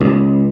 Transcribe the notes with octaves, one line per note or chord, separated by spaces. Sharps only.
C#2